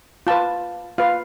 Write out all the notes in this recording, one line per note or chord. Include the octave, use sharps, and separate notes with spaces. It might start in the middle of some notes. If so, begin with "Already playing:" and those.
F4 B4 A5
F4 B4 F5